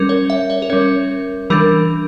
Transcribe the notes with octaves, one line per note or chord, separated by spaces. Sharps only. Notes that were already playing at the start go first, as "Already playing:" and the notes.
Already playing: G3 C#4 A#4
C#5
E5
C#5
A#4
G3 C#4 C#5
E3 G3 D4 A#4